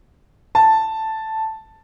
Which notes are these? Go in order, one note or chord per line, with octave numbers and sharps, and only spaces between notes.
A5